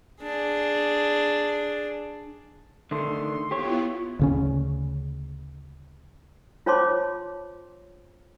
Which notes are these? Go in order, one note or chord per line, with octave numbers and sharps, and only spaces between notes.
D4 G#4
D3 D#3 A3 C6
B3 E4 F4 G4 C#5
D2 C#3 C#4
F4 C5 C#5 A5 C6 D6